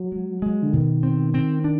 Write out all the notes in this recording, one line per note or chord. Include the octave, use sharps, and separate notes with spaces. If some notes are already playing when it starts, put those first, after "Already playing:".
Already playing: F#3
G#3
G#3
D3
B2 D#3
C4
C4
D4